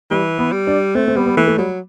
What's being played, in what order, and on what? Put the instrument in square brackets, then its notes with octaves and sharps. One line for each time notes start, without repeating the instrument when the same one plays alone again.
[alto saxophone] E3 [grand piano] G3
[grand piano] B3
[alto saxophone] G3
[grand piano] D4
[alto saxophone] A3 [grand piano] C4
[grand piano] C4
[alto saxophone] G3 [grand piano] B3
[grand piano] B3
[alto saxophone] E3 [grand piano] A3
[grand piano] A3
[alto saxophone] F#3 [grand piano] G3